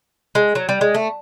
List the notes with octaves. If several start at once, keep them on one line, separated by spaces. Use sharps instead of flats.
G#3
F#3
G3
G#3
A3